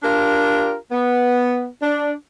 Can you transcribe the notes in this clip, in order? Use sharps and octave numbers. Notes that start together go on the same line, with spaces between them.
D4 F4 G4 A#4
B3
D4